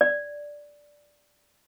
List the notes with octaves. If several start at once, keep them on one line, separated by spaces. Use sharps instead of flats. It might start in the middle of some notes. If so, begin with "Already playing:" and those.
D5